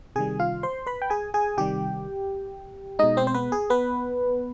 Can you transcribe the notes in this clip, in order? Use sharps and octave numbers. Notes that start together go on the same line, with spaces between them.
C3 D#3 G3 G#4 G#5
F4 F5
C5 C6
B4 B5
G5
G#4 G#5
G#4 G#5
C3 D#3 G3 G4 G5
B2 G#3 D#4 D#5
C4 C5
C5
B3 B4
G#4
B3 B4